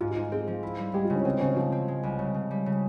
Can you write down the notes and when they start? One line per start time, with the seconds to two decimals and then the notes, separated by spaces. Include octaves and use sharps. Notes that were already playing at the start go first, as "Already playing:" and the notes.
0.01 G#2 F4
0.11 F4
0.16 G#2
0.32 C4 G#4
0.47 F3
0.63 E4
0.78 G3
0.94 G#3 G4
1.05 F4
1.10 C#3
1.16 C#4
1.25 C#3 C4
1.41 C#3 C#4
1.56 F3 C4
1.72 C4
1.88 G#3
2.03 C2
2.19 C#3
2.34 C#3
2.51 G3
2.66 C#3